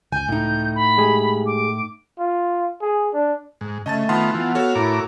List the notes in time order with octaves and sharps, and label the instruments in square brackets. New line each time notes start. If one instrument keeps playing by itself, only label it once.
[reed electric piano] C#2 [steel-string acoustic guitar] G#5 [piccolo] G6
[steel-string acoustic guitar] A2 D#4
[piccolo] B5
[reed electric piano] G#3 G4 G#4
[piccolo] D6
[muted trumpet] F4
G#4
D4
[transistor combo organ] G#2
[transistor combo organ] C#3 [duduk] A3 [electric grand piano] D#5 A5 A6
[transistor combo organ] D#3 B3 F4 [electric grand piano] F#5 A5 C6
[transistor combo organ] E3 F4 [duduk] B3
[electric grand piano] F#4 A4 C#5 [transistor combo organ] F5
[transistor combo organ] A2 A#4 D6 [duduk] E4